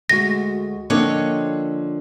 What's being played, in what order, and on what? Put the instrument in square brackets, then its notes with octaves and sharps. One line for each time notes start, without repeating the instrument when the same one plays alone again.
[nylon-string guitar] D2 G#3 F#4 [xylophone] A#6
[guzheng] D3 C#5 D#5 [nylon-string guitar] F3 A#3 C4